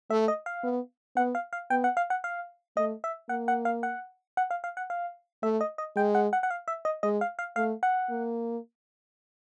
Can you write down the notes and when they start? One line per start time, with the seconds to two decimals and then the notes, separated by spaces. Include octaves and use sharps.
0.10 A3 E5
0.28 D#5
0.46 F5
0.63 B3
1.16 B3 F#5
1.35 F5
1.53 F5
1.70 B3 G5
1.84 F#5
1.97 F5
2.10 F#5
2.24 F5
2.77 A3 D#5
3.04 E5
3.29 A#3 F#5
3.48 F#5
3.65 F5
3.83 F#5
4.37 F#5
4.51 F5
4.64 F5
4.77 F#5
4.90 F5
5.43 A3 E5
5.61 D#5
5.78 D#5
5.96 G#3 G5
6.15 F#5
6.33 F#5
6.43 F#5
6.51 F5
6.68 E5
6.85 D#5
7.03 G#3 D#5
7.21 F5
7.39 F5
7.56 A3 F5
7.83 F#5
8.10 A#3